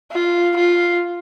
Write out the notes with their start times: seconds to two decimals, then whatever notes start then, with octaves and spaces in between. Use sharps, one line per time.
0.12 F4
0.56 F4